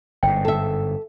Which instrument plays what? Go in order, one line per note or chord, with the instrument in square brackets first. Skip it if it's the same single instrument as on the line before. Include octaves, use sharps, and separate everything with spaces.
[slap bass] G1 G#2 [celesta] G5
[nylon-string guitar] A4 E5